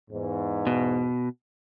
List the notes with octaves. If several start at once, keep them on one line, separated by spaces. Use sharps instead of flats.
E2 G#2
B2